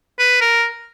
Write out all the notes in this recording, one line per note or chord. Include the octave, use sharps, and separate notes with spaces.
B4
A#4